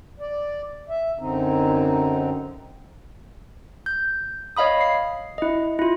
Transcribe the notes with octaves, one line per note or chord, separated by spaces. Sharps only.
D5
E5
F#2 D3 C4 D#4
G6
C#5 D#5 F5 B5 D#6
C7
E4 D#5
E4 F4